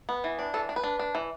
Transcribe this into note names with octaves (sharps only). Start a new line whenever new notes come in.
B3
E3
D4
E3 A4
D4
B4
D4
D4
E3